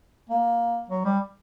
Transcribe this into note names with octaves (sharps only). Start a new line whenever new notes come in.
A#3
F#3
G3